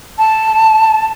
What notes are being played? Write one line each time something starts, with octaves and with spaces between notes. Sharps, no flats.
A5